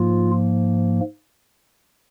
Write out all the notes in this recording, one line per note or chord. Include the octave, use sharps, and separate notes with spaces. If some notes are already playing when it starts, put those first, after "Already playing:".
Already playing: G#2 F3 A#3 F4